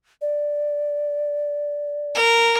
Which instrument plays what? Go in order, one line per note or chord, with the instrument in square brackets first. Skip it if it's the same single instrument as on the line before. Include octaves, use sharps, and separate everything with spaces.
[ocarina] D5
[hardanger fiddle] A#4